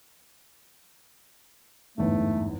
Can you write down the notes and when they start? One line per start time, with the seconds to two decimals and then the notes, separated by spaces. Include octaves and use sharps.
1.98 G1 E2 G#2 A3